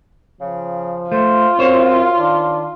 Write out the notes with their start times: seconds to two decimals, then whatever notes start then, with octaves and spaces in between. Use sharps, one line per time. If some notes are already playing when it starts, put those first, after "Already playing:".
0.41 C#3 F3
1.12 A3 F4 C5
1.59 F#2 C4 C5 C#5
2.18 D#3 D4